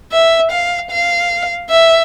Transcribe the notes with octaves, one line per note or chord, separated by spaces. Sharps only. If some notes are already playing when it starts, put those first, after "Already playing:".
E5
F5
F5
E5